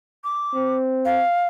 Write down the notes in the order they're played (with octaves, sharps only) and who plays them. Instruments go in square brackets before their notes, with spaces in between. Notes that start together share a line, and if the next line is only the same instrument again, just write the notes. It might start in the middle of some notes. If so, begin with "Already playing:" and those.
[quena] D6
[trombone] C4
[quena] F5